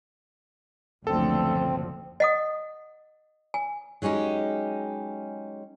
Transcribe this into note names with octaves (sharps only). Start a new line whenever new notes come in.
F#1 D2 B2 F3 C4 A4
D#5 F#5 D#6
G#5
F#3 G#3 C#4 D#4 G4